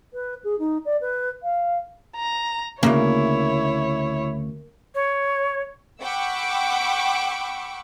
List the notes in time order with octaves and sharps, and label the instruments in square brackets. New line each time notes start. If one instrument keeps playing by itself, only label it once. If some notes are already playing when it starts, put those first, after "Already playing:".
[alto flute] B4
G#4
D#4
D5
B4
F5
[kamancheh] A#5
[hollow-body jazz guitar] D2 A#2 C#3 [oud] A#3 [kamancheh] E4 C#5
[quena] C#5
[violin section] F#5 G5 B5 C#6 D6 E6